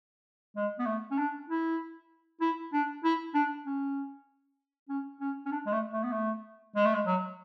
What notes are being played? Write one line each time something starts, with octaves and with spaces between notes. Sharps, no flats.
G#3
B3
A3
C#4
D4
E4
E4
D4
E4
D4
C#4
C#4
C#4
C#4
D4
G#3
A3
A3
B3
A3
G#3
A3
G#3
F#3